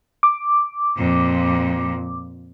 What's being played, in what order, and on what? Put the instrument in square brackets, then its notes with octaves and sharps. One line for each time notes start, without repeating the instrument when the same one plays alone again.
[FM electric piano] D6
[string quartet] F2 A#2